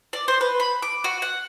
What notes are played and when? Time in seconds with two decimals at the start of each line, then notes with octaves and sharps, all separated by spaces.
0.13 D5
0.28 C5
0.41 B4
0.60 B5
0.82 D6
1.04 F#4
1.22 F#5